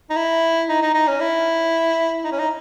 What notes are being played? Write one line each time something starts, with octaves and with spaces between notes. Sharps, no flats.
D#4
E4
D#4
D#4
D#4
C#4
E4
D#4
C#4
D#4